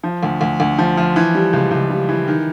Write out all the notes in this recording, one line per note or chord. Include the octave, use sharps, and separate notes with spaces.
F3
D2
D2
D2
F3
F3
E3
G3
C#2
C#2
G3
E3
D#3